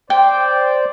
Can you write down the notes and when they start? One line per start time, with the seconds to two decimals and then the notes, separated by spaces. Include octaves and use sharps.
0.10 C5 D5 G5